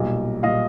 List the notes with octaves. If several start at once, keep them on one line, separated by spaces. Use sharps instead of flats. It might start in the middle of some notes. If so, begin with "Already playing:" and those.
Already playing: B1 A#2 G3
A#2 G3 D#5 F5